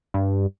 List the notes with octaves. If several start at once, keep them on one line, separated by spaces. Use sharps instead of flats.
G2